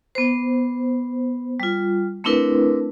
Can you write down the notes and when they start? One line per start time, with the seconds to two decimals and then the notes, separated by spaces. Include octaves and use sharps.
0.15 B3 C5
1.60 G3 F4
2.24 A3 C4 D4 E4 A#4 B4